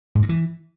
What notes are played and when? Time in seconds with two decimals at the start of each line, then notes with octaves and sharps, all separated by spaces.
0.15 G#2
0.22 G2
0.29 E3